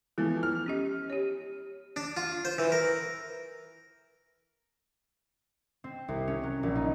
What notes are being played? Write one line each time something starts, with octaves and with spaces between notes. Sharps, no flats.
E3 F3 G#3 B3 A4
F6
C#4 G4 D#5
G4 C#5
D4
F4
C5
E3
A#4
C4
C2
C#4
F#3
A#1
D#4